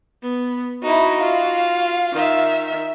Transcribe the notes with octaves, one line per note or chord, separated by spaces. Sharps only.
B3
D#4 E4 F#4
F4 F5
D#3 E5